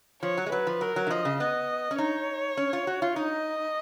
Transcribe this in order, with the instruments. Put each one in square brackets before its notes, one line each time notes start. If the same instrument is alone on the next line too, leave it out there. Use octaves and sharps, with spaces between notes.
[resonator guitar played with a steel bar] F3 [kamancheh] C#5
[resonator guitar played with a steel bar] F#3
G#3
[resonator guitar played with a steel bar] F#3 [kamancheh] B4
[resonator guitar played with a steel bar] F3
[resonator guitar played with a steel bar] F#3 [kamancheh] A#4
[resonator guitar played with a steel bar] F#3
D#3
[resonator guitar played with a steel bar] F3 [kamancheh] D#5
[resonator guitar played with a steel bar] C#3
[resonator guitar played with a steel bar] B3 [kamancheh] D#5
[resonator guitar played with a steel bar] C#4
[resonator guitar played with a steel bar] D#4 [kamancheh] C#5
[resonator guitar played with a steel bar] C#4
F4
F#4
F4
[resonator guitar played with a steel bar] D#4 [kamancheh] D#5